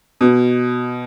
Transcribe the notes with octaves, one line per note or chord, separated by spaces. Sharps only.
B2